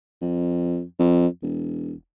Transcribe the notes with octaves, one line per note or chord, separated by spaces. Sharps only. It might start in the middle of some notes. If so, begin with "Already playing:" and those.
F2
F2
E1